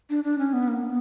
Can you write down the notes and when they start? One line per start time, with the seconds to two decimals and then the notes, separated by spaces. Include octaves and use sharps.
0.10 D4
0.24 D4
0.38 C#4
0.53 B3
0.68 A#3
0.83 B3